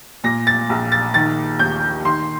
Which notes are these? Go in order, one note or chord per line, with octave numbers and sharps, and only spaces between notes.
A#2 A#6
A6
A#1
A6
D#3 A6
D#2 G6
D#3 C6